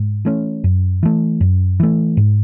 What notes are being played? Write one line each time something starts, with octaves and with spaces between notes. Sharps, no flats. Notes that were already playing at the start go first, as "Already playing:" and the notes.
Already playing: G#2
E3 A3 C#4
F#2
E3 A3
F#2
E3 A3
G#2